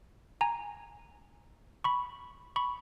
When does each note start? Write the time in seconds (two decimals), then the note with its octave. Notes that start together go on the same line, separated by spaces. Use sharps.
0.41 G#5 A#5
1.84 B5 C#6
2.56 B5 C#6